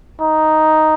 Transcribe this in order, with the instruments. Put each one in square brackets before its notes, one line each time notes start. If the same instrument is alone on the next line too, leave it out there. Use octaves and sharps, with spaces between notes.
[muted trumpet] D#4